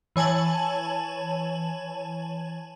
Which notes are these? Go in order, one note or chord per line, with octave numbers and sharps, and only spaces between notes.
E3 C#5 G#5 A5 F#7